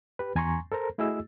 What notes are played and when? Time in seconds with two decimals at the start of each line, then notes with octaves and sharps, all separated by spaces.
0.19 G4 B4
0.35 E2 G#5 A#5 C6 C#6
0.72 A4 A#4 C5 A#5
0.98 A3 E4 F#4 G#4 D#5 E6